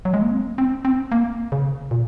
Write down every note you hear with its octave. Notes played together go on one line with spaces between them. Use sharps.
F#3
G#3
A#3
C4
C4
C4
A#3
C#3
A#2